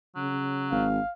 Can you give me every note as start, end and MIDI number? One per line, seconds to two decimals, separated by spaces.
0.16 0.75 49
0.16 0.86 54
0.71 0.99 32
0.71 1.13 77